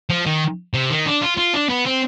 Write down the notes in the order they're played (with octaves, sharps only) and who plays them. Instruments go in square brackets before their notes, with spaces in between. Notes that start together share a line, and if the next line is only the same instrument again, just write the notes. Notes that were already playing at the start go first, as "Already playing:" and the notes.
[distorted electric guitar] F3
D#3
C3
D#3
D4
F4
F4
D4
B3
C4